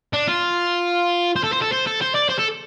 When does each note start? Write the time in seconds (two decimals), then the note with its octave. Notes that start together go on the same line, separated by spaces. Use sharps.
0.13 D4
0.27 F4
1.36 C5
1.44 A4
1.53 C5
1.62 A4
1.72 C5
1.86 A4
2.01 C5
2.15 D5
2.29 C5
2.38 A4